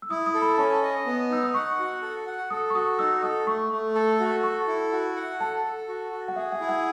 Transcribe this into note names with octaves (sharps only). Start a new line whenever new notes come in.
E6
E4 D#6
D#6
A4
B5
C#4 A5
D#5
B3
D#4 E6
D#6
F#5 C#6
F#4
A4
F#5
A4 D#6
C#6
F#4 D#6
D#4 E6
A4 D#6
A3 C#6
A3
A4
F#4
A4 C#6
E4
F#4
F#5
A4 A5
A4
F#4
F#4
F#5
G#4 E5
F#5
E4
F#5